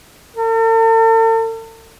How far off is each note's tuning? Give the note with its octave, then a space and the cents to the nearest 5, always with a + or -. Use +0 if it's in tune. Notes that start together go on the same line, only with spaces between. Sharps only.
A4 +45